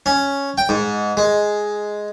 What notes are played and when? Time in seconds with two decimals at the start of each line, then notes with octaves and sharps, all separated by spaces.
0.06 C#4
0.58 G5
0.69 G#2
1.17 G#3